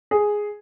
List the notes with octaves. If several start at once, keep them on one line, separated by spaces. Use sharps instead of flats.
G#4